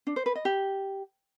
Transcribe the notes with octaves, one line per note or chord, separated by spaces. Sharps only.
D4
C5
B4
D#5
G4